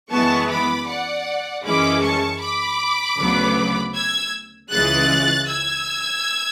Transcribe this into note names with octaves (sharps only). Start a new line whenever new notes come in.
F#2 E3 G#3 B3 A5 C#6
B5 D6
D5 F#5
F#2 E3 G#3 C#4 B5 D6
A5 C#6
B5 D6
D2 C#3 F#3 B3
E6 G#6
C#2 C#3 E3 G#3 F#6 A6
E6 G#6